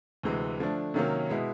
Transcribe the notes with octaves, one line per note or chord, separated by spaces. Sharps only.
D2 C3 E3 G#3
D3 F3 A3 D4
C3 D#3 F#3 A#3 C#4
B2 G#3 B3 E4